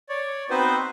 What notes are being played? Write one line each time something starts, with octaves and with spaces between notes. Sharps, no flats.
C#5 D5
B3 C4 D#4 F#4 B4 C5